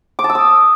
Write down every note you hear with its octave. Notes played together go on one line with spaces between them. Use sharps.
D6
A5
E6
D#6